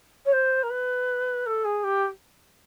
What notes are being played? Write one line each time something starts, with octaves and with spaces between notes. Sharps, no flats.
C#5
C5
A#4
B4
A4
G#4
G4